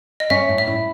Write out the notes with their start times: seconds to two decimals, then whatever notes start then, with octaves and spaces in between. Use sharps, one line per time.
0.20 D#5
0.30 C#4 E5
0.49 A2
0.58 E5
0.67 E4